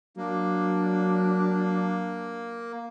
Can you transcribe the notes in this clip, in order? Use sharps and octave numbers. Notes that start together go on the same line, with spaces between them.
F#3 A#3 D4